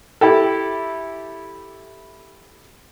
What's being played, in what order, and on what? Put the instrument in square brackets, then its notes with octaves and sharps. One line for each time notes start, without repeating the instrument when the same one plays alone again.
[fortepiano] E4 G4 A4